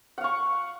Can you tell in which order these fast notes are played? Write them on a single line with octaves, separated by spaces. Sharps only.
F#5 F5 C#6